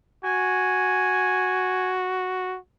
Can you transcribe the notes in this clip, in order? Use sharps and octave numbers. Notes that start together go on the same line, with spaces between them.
F#4 G#5